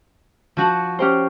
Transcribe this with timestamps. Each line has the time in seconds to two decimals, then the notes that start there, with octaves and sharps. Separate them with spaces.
0.57 F3 F#4 F#5
0.99 C#4 G4 C5